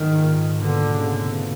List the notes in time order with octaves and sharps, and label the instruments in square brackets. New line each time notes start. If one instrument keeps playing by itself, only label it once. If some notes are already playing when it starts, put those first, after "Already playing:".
Already playing: [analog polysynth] G#2 [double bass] D#3
[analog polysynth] A#2
[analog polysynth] B2 [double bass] D3
[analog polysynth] C#3
C3